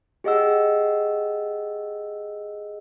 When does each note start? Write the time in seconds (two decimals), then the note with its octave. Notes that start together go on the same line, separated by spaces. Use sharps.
0.24 G4 G#4 D#5 F#5 E6